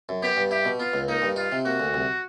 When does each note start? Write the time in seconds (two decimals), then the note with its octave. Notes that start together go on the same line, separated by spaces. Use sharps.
0.09 F#2
0.23 B3 G4
0.37 G2
0.51 E4 G4
0.65 B2
0.80 B3 F4
0.94 C#2
1.08 A#3 D#4
1.22 G2
1.36 D#4 F4
1.52 C3
1.65 A#3 F#4
1.80 D2
1.94 C2